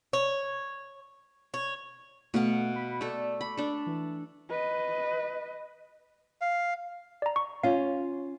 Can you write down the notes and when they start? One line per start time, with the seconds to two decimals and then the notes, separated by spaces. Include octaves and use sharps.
0.13 C#5
1.54 C#5
2.34 B2 A3 F5 F#5
2.76 B5
3.01 A3 A4 D5
3.41 B5
3.57 D4 A4
3.86 E3
4.50 B4 D#5
6.41 F5
7.22 D5 A#5
7.36 C#6
7.63 C#4 F4 F5